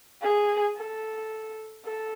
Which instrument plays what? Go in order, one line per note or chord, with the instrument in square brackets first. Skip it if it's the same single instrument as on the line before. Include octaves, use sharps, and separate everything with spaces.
[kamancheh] G#4
A4
A4